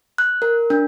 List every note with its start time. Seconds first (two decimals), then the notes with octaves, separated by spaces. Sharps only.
0.18 F#6
0.42 A#4
0.70 D4